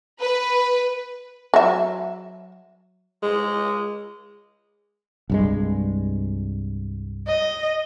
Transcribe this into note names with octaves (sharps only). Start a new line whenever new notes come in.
B4
F#3 E5
G#3
C2 G2 G#3
D#5